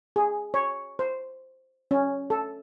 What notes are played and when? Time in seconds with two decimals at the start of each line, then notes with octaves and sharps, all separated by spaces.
0.16 G#4
0.54 C#5
0.99 C5
1.91 C#4
2.30 A4